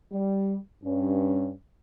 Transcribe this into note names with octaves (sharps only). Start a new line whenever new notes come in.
G3
G2 C#4